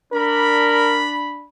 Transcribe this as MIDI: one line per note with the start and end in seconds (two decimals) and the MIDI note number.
0.13 1.46 62
0.13 1.04 70
0.13 1.46 83